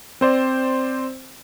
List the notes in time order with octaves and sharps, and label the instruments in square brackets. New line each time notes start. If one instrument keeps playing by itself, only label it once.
[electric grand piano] C4 C5 D5